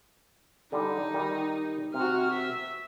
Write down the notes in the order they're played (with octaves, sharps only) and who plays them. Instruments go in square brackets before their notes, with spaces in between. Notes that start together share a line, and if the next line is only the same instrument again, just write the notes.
[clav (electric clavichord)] D3 G3 [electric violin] D#4
[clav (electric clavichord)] D#3 G3
[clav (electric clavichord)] C3 [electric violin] F#4 F6
[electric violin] E5